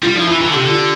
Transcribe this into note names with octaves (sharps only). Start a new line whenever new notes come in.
G3 F4
F3 E4
E3 F4
E3 F4
D3
C3 G4
D3
F4